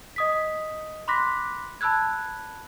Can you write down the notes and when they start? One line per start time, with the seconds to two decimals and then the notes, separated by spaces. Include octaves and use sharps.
0.16 D#5 D#6 B6
1.08 B5 C6 D6 F#6 A#6 B6
1.81 A5 B5 E6 F#6 G#6